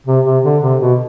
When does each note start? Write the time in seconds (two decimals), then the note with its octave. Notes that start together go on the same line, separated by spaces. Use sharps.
0.07 C3
0.25 C3
0.44 D3
0.63 C3
0.81 B2